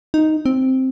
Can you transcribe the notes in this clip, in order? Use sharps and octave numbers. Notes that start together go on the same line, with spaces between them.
D#4
C4